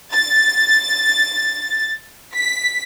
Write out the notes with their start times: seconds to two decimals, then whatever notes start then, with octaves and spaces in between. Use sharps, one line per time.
0.13 A6
2.34 B6